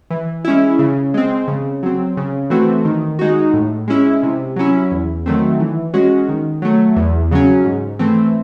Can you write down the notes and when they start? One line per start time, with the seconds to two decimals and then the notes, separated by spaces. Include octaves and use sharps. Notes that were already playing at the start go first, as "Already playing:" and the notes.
0.10 E3
0.45 G#3 C#4 E4
0.79 C#3
1.14 G#3 C4
1.48 C#3
1.83 F#3 C4
2.17 C#3
2.50 E3 A3 C4 F#4
2.85 D#3
3.19 G#3 D#4 F#4
3.53 A2
3.88 G#3 C#4 E4
4.23 C3
4.56 F#3 C#4 E4
4.91 E2
5.26 D#3 F#3 A3 C4
5.60 E3
5.94 G#3 C#4 F#4
6.29 D#3
6.62 F#3 A3
6.96 E2
7.31 C#3 F#3 C#4
7.65 G#2
7.99 E3 A3 C4